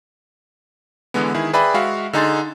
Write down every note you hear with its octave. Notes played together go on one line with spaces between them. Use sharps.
D3 E3 G#3 B3
D#3 E4 G#4
G#4 B4 D5 E5 G5 B5
G#3 F#4 E5 F5
D3 D#4 G#4 C6 A6